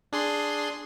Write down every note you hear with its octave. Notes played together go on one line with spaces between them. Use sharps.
D4 G#4 C6